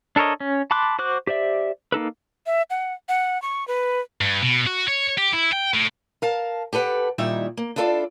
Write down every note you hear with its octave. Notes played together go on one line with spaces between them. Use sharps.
D4 A4 A#4 C#5 D#5
C#4
A5 B5 C6 D6 F#6
F#4 C5 D6 F#6
G4 C5 D5 E5
A#3 D#4 A4 B4
E5
F#5
F#5
C#6
B4
G2
B2
F#4
C#5
G4
E4
G5
A2
A#4 F5 A5
G4 A4 B4 F#5
A#2 D#3 G3 D#4 E4 E5
A#3
D4 E4 F4 A4 C5 D5